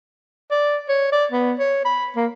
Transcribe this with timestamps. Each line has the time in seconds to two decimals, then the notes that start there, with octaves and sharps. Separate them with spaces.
0.51 D5
0.89 C#5
1.12 D5
1.32 B3
1.59 C#5
1.85 B5
2.16 A#3